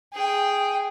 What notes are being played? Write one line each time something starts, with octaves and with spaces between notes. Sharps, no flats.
G#4 G5